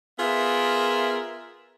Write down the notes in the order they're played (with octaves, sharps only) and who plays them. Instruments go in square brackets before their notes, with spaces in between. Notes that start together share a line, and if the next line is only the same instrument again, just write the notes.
[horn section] B3 F4 G#4 A#4 E5